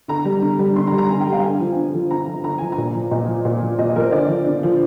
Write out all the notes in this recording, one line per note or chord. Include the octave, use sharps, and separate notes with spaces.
D3 A#5
G3
D3
G3
D3 C6
A#5
G3
A#5
D3 G#5
G5
G3
F5
D3 G#5
F3
D3
F3
D3 A#5
F3
D3 A#5
F3 G#5
A#5
A#2
F3
A#2 D#5
F3
A#2
F3
A#2 D#5
D#5
F3 A#4
C5
D3 D5
F3
D3
F3